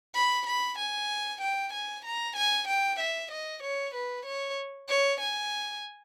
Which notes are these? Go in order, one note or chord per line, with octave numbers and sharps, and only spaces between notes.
B5
B5
G#5
G5
G#5
A#5
G#5
G5
E5
D#5
C#5
B4
C#5
C#5
G#5